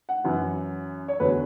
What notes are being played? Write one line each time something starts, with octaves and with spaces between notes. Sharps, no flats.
F#5
F#2 E3
C#5
E2 D3 F#3 B4